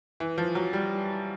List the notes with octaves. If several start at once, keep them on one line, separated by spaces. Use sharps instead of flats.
E3
F3
F#3
G3